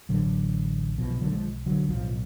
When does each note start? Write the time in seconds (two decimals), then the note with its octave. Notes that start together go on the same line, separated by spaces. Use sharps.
0.09 A1 A2 D3 F#3
0.98 B1 B2 F3
1.10 F3
1.21 D3 F#3
1.32 F3 G#3
1.66 D3 F#3
1.88 B1 A2 F3